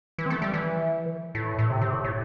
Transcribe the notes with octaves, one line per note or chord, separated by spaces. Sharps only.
E3
C4
A3
G3
E3
A2
A2
C3
C3
A2
A2